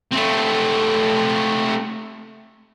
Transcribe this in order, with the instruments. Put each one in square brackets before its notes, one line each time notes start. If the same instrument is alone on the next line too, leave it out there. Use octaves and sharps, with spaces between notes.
[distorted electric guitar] A3 C4